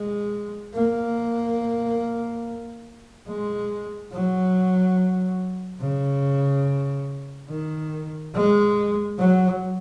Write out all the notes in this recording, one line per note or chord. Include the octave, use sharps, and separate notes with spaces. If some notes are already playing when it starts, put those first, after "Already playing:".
Already playing: G#3
A#3
G#3
F#3
C#3
D#3
G#3
F#3